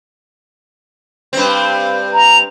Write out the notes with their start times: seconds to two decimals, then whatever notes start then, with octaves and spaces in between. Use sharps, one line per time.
1.33 G2 C4
2.13 A#5